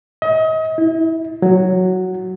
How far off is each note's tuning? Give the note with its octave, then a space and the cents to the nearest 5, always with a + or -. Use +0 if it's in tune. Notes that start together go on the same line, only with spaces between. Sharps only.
D#5 +35
E4 -20
F#3 +0